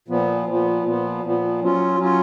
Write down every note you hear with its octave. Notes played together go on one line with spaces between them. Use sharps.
A#2 F3 B3
A#2 F3 B3
A#2 F3 B3
A#2 F3 B3
F#3 C#4 F4
F#3 C#4 F4